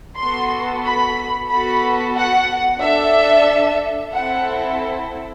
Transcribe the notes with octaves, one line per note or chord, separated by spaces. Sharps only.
B3 F#4 A4 C6
B5
B3 F#4 A4 B5
F#5
D4 A4 E5
C4 E4 A4 F#5